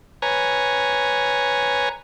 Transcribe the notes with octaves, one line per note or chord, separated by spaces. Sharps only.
B4 C#5 G#5 A#5